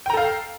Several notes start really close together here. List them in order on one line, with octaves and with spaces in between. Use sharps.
G5 A#5 A4 F5